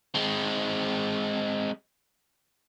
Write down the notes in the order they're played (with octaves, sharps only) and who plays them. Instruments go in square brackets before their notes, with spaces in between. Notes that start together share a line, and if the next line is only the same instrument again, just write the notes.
[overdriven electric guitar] G#3 C4